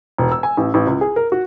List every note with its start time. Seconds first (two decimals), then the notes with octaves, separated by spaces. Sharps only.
0.18 E1
0.32 E6
0.43 G#5
0.57 A1
0.74 A1
0.87 C#2
1.01 G#4
1.16 A#4
1.32 F#4